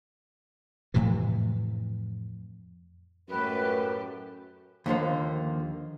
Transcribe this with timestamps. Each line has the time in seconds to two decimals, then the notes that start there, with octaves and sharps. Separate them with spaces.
0.94 F2 A2 C3 E3
3.28 F#2 A2 A3 G4 B4
4.86 D#2 D3 F3 A#3